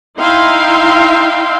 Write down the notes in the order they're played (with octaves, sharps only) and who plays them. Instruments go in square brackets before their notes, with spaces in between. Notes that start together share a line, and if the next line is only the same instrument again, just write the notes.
[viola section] D#4 E4 E5 F5 G5 C6